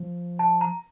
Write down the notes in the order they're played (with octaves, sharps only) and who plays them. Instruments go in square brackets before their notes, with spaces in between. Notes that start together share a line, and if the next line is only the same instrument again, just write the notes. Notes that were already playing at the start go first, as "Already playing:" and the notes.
Already playing: [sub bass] F3
[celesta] A5
A#5